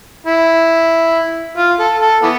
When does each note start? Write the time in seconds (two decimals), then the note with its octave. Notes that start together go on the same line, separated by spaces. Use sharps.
0.27 E4
1.57 F4
1.79 A4
2.01 A4
2.23 E3 B3